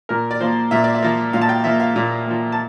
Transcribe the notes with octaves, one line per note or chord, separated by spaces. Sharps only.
A#2 A#4
D5
F3 A#3 C5
A#2 E5
D5
E5
F3 A#3
A#2 F5
A5
G5
F3 A#3 E5
F5
A#2
F3 A#3
A5